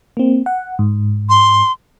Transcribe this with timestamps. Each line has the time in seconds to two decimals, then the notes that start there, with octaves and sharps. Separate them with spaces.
0.17 A#3 C4
0.46 F#5
0.79 G#2
1.29 C6